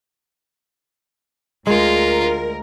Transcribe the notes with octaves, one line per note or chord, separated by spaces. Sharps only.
D2 G#3 F4 A#4